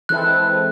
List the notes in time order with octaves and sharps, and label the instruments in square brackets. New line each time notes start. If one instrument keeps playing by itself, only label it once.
[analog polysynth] E3 G#3 C4 E4 A4 [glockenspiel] F#6